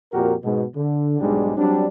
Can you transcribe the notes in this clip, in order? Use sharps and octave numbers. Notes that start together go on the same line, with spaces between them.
F2 A#2 F#4 G4 A#4
G#2 B2
D3
B1 G#2 G3 G#3 D4 D#4
F#3 G3 C4 D4